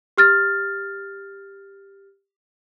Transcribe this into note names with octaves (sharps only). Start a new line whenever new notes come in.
G4 F6 A6